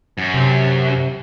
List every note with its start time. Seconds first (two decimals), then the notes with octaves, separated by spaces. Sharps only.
0.18 F#2
0.34 C3